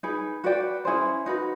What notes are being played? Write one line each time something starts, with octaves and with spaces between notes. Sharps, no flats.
D#4 G#4 B4
F#4 B4 D5 G5
C#4 E4 G#4 C5
D#4 F#4 B4